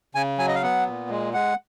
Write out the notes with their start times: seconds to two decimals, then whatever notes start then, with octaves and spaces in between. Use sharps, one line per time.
0.15 C#3 G#5
0.38 F#3 G#5
0.48 D#5
0.55 F5
0.62 B3 F#5
0.87 A#2
1.10 G#3
1.34 G#3 F#5